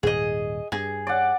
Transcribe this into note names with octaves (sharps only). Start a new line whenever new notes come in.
D#1 G#2 G#4 D#5
G2 G#4
D5 F#5